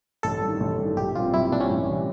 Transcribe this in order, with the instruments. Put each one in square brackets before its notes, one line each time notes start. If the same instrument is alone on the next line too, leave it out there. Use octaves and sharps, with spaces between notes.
[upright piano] A1 [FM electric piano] A4
[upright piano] G2
D#3
A1
G2 D#3
[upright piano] A#1 [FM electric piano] G4
[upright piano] A#2 G3 C4 [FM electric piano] F4
[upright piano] A#1 [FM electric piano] E4
[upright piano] A#2 G3 C4 [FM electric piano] D4
[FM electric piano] C#4
[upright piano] A1
E3 G3